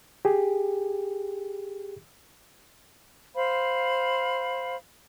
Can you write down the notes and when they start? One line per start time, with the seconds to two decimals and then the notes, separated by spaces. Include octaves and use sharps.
0.25 G4 G#4
3.35 C5 F5 B5